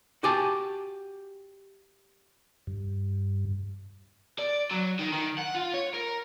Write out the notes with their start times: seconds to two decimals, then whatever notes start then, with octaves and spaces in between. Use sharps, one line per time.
0.23 F#4 G4 G#5 A5
2.67 G2
4.39 D5
4.71 F#3
4.99 D#3
5.12 D#3
5.38 F#5
5.54 F4
5.73 C#5
5.94 A#4